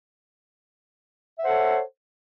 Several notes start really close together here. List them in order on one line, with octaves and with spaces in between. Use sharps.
E5 F#5 C5 A4 C#5